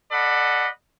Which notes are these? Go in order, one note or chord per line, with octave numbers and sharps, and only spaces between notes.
A4 D5 D#5 F#5 B5